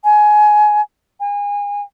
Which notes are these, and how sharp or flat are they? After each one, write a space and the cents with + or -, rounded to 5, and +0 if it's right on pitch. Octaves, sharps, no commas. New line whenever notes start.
G#5 +20
G#5 -30